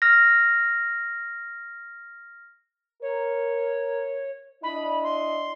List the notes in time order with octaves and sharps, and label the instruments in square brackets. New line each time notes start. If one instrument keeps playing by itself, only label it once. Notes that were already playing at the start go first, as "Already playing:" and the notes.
[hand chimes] F6 A#6
[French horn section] A#4 [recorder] C#5
[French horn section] D4 E4 D#5 [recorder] B5
[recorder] C6